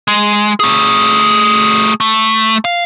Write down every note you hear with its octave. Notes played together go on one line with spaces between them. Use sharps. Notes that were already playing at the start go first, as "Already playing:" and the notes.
G#3
A3 G#4
A3
F5